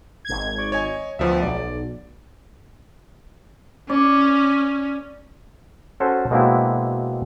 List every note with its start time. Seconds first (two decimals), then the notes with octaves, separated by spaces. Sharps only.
0.25 G#1 G#6
0.58 D5 C#6
0.72 C#5 D#5 G#5
1.19 D2 F3 B3 E5
1.42 B1 D5
3.90 C#4 D5
6.00 C#4 F#4 A4 C5
6.31 B2 G#3 A#3 C4 D4 E4